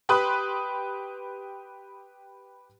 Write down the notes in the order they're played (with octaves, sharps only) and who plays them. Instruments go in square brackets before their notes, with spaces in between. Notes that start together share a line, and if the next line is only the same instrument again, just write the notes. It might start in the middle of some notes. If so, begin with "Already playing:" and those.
[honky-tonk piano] G4 B4 B5 C6 D#6 F#6